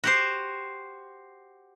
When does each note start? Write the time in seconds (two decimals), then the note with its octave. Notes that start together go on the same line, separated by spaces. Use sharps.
0.04 F#4 G4 C5